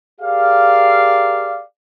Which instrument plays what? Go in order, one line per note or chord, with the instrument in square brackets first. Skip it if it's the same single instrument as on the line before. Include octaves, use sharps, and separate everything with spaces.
[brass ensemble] G4 G#4 A#4 D5 F5